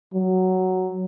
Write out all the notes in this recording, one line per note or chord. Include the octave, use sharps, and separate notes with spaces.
F#3